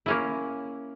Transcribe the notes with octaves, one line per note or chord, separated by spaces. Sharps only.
A#3 C#4 E4